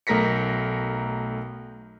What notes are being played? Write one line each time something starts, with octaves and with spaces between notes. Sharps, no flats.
B1 A3 A#4 A#6 B6 C#7